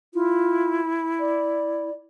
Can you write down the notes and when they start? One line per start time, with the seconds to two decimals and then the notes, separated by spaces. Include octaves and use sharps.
0.14 E4 F4
1.20 D5